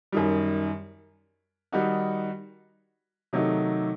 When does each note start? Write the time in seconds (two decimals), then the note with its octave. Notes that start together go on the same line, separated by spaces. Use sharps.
0.12 F#2 D#3 G3
1.72 D#3 G3 D#4 F#4
3.33 C3 D#3 F#3 A3 D#4